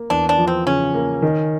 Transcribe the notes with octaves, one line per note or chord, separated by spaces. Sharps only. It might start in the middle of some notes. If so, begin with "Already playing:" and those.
Already playing: A#3
E2 D4
D4
F3
C4
C#3 C#4
A#3
D#3